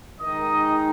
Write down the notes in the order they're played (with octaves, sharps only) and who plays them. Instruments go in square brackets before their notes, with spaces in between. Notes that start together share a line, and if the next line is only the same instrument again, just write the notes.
[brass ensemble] D#3 G#3 D#4 D#5